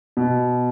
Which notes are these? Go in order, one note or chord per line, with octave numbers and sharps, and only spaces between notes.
B2